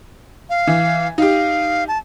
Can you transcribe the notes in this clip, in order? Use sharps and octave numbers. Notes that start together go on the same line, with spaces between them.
F5
E3
D#4 G4 F5
A5